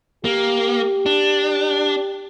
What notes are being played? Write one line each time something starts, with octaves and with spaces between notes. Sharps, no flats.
A#3 G4
D4